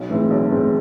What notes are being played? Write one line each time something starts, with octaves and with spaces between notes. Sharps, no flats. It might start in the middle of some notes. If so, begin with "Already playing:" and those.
Already playing: B1
A2 E3 G#3 C4
B1
A2 E3 G#3 C4